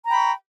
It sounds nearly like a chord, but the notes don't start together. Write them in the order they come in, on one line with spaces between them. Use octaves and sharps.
A#5 G5 B5 C#6